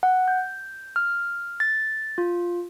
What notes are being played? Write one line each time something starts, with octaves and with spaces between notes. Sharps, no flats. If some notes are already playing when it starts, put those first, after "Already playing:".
F#5
G6
F6
A6
F4